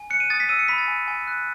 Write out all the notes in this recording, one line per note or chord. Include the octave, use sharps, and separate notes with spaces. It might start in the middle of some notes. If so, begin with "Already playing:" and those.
Already playing: G#5
F#6 C#7
D#7
D#6 A6
B6
E6 D#7
C#7
B5 B6
A6
G#5
G#5
F#6